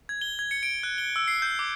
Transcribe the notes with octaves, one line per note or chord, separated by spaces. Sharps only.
G#6
G7
G#6
C#7
D7
F#6
G7
E6
C7
G6
D6